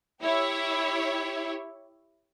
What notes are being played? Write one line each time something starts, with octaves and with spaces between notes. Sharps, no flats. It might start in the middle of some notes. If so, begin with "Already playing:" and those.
E4 G4 C#5